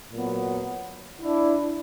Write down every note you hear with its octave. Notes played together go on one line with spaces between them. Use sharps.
A#2 F#3 B3
D4 E4